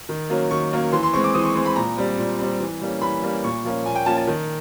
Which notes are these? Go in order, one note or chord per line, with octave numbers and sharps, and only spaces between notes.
D#3
F#3 A#3 C#4
D#3 C#6
F#3 A#3 C#4
E3 C6
C6
G#3 C4 C#6
D6
E3 D#6
C#6
G#3 C4
B5
A#2 A#5
G3 C4
A#2
G3 C4
E3
G3 A#3 C#4
E3 B5
G3 A#3 C#4
A#2 C#6
F3 A#3 C#4
A#2 G#5
G5
F3 A#3 C#4 A5
A5
D#3